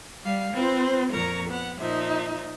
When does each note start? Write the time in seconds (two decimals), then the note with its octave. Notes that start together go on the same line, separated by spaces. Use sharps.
0.23 G3 F5
0.53 C4 F4 B4 C5
1.12 F2 A#2 A#4 A#5 C#6
1.47 B3 F#5
1.78 A#2 F3 D#4 E5